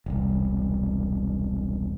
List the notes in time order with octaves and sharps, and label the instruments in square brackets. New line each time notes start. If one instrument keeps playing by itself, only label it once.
[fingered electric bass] E1 C2